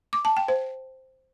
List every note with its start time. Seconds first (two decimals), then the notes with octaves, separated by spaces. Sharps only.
0.13 D6
0.25 A5
0.37 G5
0.48 C5